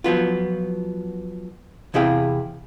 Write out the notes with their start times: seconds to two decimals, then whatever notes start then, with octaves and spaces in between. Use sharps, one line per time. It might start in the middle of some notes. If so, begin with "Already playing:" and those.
0.04 F3 F#3 B3 F4
1.94 E2 C3 E4 G#4 F5 G5